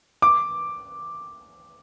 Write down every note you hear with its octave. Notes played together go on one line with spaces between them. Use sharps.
D6